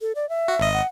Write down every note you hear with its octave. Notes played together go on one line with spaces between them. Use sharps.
A4
D5
E5
F#4
G#1 D#5
F#5